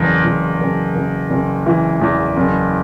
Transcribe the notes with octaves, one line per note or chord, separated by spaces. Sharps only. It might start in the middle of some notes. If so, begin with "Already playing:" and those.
Already playing: F#1 E2
E2
F#1
F#1
F#1
E3
E2
F#1